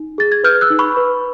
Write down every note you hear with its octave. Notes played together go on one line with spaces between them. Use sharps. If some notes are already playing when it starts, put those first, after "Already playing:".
Already playing: D#4
G#4 A6
G#6
B4 F6 G6
E6 F#6
D#4
B5 C#6
B4